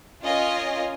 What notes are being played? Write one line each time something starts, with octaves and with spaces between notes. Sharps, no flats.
C#4 F4 A#4 D#5 G#5